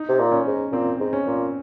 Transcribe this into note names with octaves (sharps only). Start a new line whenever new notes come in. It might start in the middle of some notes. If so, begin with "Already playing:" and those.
Already playing: D#4
C3
A#2
C#4
G#2
A#2 C4
G#2
C#4
A#2